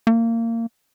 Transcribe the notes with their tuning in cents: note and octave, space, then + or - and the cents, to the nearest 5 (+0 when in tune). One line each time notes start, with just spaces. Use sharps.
A#3 -25